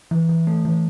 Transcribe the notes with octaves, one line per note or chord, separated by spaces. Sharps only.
E3
E3
A3
E3